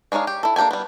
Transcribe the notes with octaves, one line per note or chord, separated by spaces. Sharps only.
G#3 D4 D#4 C#5 F5
G4
E4 A4
A#3 D4 G4 A4 G#5
G3 B3